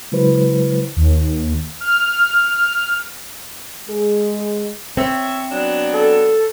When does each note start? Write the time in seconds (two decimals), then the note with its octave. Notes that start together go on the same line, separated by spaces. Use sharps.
0.12 C#3 F#3 G#3 E4 B4 C5
0.96 D#2
1.81 F6
3.89 G#3 G#4
4.97 C4 C#5 E5
5.52 F#3 B3 D4
5.94 A4